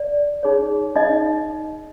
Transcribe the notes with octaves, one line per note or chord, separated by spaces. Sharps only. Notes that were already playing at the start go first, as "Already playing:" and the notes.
Already playing: D5
D#4 G#4 C#5
D#4 D#5